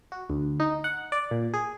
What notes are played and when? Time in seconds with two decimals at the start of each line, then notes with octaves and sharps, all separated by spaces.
0.12 F#4
0.30 D2
0.60 D#4
0.84 F#5
1.12 D5
1.31 A#2
1.54 G#4